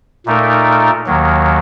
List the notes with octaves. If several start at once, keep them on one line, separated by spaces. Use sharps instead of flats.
A#2 A3 D#4 A#4
D#2 D#3 F#3